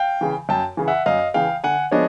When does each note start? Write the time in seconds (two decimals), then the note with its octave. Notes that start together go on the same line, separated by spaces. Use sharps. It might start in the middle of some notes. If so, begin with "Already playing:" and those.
Already playing: F5 G5
0.21 C#3 E3
0.49 F#2 G5 A5
0.77 C#3 E3
0.88 E5 F#5
1.06 F#2 D#5 F5
1.34 C#3 E3 F5 G5
1.64 D3 F#5 G#5
1.91 F3 G#3 B3 D4 C#5 D#5